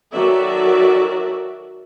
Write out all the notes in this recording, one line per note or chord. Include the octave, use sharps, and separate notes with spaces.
D#3 F#3 F#4 A4 D5 E5